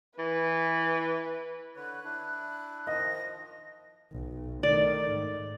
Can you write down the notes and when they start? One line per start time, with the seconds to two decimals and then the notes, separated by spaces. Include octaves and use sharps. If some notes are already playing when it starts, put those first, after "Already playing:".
0.19 E3 B4
1.76 D3 B4 C#5 F#6
2.04 D4 E4
2.87 D#3 F3 D#5 A#6
4.12 B1
4.63 D#3 A3 D5
5.12 G#2